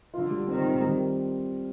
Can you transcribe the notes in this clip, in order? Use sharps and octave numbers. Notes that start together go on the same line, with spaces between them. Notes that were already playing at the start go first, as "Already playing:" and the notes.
D3 F4
G3
D#3 C4
C4
G3